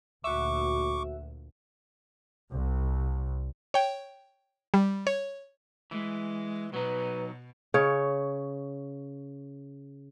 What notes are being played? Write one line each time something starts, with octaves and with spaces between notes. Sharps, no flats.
D2 A#2 F#4 E5 C#6 D6
C2
C#5 G5
G3
C#5
E3 G#3
B2 F#3 D#4 B4
C#3 C#5